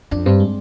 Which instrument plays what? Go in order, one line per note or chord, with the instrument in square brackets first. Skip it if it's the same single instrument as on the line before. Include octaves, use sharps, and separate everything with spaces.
[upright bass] F2 [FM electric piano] D4
[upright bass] G2 [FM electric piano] C4
[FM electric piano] G#3